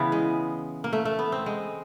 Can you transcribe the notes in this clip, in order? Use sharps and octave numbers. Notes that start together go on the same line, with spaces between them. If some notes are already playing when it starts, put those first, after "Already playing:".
Already playing: C#3 E3 B3
G#3
A#3
A3
A3
B3
C4
G#3